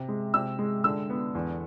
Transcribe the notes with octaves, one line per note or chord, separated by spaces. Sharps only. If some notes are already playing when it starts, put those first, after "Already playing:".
Already playing: C3
G#3
C3 E6
G#3
D3 E6
B3
E2